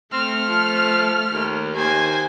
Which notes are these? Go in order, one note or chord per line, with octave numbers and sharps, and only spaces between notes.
A3 C4 F6
F3
D#2
D#2 C5 G#5